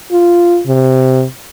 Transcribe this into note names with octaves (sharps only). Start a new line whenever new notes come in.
F4
C3